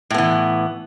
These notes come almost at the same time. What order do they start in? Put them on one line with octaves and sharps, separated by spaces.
A2 B3 E3